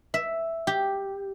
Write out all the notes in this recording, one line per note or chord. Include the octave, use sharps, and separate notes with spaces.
E5
G4